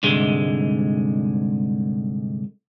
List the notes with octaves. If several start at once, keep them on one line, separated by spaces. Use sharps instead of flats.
C2 G#2 D3 G#3